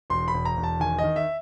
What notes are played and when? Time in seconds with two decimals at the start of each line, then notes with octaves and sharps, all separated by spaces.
0.10 E1 C6
0.28 B5
0.34 E1
0.45 A#5
0.57 E1
0.63 A5
0.80 D#3 G#5
0.99 D#5
1.04 D#3
1.16 E5